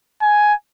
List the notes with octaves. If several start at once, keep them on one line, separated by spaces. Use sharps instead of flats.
G#5